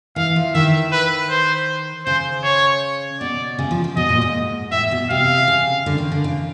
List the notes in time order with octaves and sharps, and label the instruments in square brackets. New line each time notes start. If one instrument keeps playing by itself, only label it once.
[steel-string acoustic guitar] E3 [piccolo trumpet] F5
[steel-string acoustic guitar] F3
[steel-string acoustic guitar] D#3 [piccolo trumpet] E5
[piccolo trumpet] B4
C5
[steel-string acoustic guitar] C#3 [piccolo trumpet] C5
[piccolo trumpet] C#5
[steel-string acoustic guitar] B2 [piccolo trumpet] D5
[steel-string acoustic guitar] C#3
F3
F3
[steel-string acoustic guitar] B2 [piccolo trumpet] D#5
[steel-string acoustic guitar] A#2
G#2
[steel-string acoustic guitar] A2 [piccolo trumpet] E5
[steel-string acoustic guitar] B2
[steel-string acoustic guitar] C3 [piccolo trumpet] F5
[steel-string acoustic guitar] C#3
D3
D#3
D3
C#3